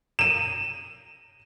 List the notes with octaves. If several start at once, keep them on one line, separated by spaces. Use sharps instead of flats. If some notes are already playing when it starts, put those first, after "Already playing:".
D#7 E7